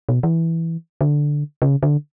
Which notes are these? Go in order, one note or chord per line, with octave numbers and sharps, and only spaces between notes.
B2
E3
D3
C#3
D3